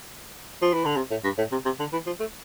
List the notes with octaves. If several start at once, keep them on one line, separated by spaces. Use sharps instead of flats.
F3
E3
D3
C3
A2
G2
A2
C3
C3
D3
E3
F3
A3